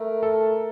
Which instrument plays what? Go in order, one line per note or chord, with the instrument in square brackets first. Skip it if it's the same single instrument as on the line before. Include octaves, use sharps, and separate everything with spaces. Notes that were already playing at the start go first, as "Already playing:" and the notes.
Already playing: [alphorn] A3 [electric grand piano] A#4
[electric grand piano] A4